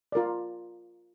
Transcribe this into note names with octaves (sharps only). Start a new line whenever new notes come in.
F4 A#4 D5